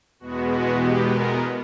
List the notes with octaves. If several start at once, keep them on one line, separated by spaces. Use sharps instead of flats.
E2 B2 G#3 B3 F#4
F#4
G4
A#4